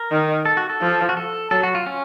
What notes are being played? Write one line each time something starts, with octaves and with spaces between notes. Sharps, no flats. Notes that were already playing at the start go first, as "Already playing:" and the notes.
Already playing: A#4
D#3
A4
F#4
A4
F3
F#4
A4
F#3 A4
F#4
F4
C#4